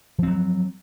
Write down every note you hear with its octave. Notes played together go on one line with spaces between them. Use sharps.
F3 F#3 C4